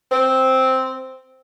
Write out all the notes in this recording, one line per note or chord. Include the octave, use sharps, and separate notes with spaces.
C4